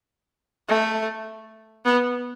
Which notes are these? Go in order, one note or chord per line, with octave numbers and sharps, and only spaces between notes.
A3
B3